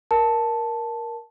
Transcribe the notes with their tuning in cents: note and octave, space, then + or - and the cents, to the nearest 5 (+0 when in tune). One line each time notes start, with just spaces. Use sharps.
A#4 +10 A5 +0